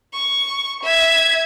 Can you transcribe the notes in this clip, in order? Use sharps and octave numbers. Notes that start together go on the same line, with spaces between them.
C#6
E5 G#6